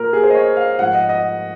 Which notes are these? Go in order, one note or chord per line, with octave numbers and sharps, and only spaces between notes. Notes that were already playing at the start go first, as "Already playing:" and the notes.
Already playing: A#2 A#4
G#4
C5
D#5
C#5
F5
G#2 F3 F#5
D#5
D#5